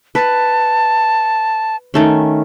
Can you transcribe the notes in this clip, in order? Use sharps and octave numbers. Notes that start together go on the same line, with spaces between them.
B4 A5
D#3 A3 C#4